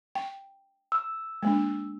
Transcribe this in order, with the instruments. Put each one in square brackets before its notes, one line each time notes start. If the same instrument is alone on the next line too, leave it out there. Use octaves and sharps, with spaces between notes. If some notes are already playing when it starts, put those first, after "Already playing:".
[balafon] G5
[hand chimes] E6
[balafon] G#3 A#3 D4